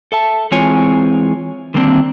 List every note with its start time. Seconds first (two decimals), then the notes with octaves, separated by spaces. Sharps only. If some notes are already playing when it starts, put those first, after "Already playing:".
0.12 A4 E5 A5
0.51 E3 G#3 C4 F4 C#5 G#5
1.74 D3 D#3 G3 A#3 C4 D4